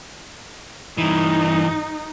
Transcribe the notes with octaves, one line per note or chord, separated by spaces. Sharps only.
G2 E3 D#4